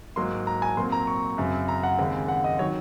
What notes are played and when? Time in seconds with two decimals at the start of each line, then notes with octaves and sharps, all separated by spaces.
0.16 G#2 F#3 A#3 C6
0.47 A#5
0.62 G#5
0.77 A#2 F#3 C4 C6
0.92 A#5
1.07 C#6
1.38 F#2 C#3 F#3 C4
1.68 A#5
1.83 F#5
1.98 D#2 C#3 G#3 C4
2.28 F#5
2.44 D#5
2.59 D#3 F#3 C#5